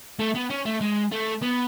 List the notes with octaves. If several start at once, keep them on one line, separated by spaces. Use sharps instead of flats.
A3
B3
C#4
A3
G#3
A3
B3